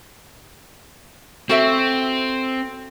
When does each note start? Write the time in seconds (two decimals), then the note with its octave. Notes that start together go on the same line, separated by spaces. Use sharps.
1.49 C4 F#4 A4 E5